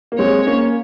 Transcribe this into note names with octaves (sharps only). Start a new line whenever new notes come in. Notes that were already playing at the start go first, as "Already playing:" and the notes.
A#3
G#3 C4 C#5
A#3 C#4